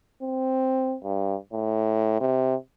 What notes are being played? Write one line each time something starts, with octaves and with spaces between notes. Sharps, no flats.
C4
G2
A2
C3